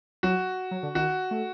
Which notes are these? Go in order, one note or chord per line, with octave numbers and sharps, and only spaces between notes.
F#3 F#4
F#3
D3
D#3 F#4
A3